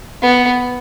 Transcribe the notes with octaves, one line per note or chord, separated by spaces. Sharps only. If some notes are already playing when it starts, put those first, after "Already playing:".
B3